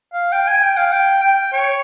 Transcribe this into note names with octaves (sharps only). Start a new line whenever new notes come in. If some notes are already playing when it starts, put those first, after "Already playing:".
F5
G5
G#5
G5
F5
G5
G5
C#5